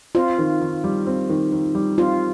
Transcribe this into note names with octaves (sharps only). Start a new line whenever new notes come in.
C4 F4
D#3
D#3
G3
C4
D#3
D#3
G3
C4 F4